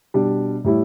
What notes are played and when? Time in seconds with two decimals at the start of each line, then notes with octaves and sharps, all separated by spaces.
0.14 B2 G3 D4
0.64 A2 G3 E4